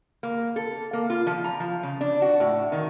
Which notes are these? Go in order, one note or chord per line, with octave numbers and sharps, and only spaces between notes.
A#3
A4
A#3
F4
F3
A#5
F3
C#3
D4
F#4
A2
D#3